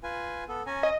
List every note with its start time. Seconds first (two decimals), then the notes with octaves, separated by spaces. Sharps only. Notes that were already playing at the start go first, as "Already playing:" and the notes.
0.03 F4 B4 G#5
0.48 B3 A4
0.66 C#4 G#5 A#5
0.83 D#5